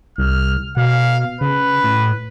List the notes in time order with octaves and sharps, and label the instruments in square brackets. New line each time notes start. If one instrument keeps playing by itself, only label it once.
[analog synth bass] C2 [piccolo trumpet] F6
[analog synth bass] B2 [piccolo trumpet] F5
[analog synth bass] C#3 [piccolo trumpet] B4
[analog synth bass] A2